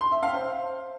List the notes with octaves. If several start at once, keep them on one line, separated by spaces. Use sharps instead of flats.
C6
E5
F5
C5